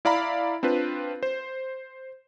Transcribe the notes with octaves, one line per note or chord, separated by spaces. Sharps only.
E4 D5 F5 A#5 B5
C4 D4 F4 B4
C5